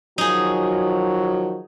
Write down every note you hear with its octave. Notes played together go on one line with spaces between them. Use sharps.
D#3 F3 F#3 D#4 G#4